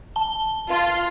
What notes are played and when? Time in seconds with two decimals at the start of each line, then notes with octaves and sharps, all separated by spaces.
0.16 A5 G7
0.69 F4